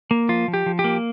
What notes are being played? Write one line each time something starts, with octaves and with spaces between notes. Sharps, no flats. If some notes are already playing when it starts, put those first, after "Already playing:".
A#3
F3 F4
F3
G4
F3
G4
A#3